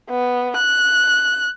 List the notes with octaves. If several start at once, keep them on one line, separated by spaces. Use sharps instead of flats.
B3
F#6